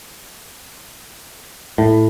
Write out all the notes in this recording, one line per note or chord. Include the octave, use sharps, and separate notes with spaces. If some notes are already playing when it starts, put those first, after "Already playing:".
A2